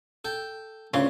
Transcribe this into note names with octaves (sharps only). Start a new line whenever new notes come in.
A4 G5
D2 C#3 F4